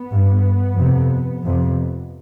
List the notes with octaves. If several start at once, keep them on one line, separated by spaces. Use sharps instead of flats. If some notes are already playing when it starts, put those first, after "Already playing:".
Already playing: B3
G2
F2 C3
F2 C3